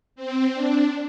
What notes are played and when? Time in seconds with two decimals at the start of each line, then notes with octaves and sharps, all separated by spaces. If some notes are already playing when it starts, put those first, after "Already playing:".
0.16 C4
0.54 D4